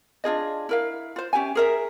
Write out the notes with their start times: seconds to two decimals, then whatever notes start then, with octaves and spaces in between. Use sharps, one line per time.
0.24 D4 F4 G#4 D#5
0.69 E4 A#4 F5
1.16 F4 C5
1.33 C#4 G4 E5 G#5
1.55 G#4 A#4 E5